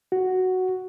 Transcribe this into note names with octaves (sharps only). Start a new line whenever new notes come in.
F#4